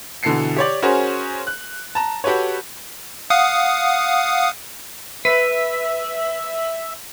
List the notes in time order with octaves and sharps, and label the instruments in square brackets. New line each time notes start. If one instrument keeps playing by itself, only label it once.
[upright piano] B2 D3 E3 A4 C7 C#7
G4 C#5 D5
C#4 F#4 G#4 A#4 C5 C#5
F#6
A5 A#5
F#4 G4 A4 B4 C#5
[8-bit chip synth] F5 F#5 D#6
[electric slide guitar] B4 [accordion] E5